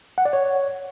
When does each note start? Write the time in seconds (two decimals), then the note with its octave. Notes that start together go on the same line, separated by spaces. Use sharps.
0.18 F#5
0.25 D5
0.33 C#5